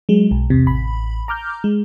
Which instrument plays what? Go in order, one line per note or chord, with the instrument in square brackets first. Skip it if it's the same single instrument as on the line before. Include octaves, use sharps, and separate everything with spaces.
[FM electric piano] F#3 G#3
B1
E2 C3
A1 B5
A#5 D6 F6 G6
G#3